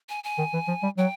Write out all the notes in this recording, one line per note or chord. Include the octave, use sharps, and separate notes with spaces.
G#5
G#5
D#3
E3
F3
G3
F#3 G5